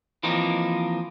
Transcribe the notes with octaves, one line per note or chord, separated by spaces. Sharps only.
E3 F3 A#3 C4 D#4